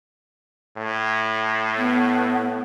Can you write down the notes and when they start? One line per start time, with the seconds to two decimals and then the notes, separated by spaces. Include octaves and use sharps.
0.77 A2
1.77 B3